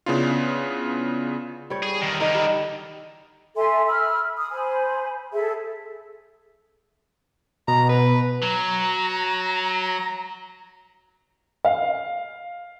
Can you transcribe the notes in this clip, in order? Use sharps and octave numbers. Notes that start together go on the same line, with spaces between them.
C#3 B3 D4 E4 F4
G3 C#5
G#4
E2 D#3
D3 D#3 D#4 D#5
G3
A4 E5 G#5 C6
B5 E6 F6
D#6
C5 G#5 B5
G#4 A4 E5
B2 A#5
B4
F#3 A#5
F5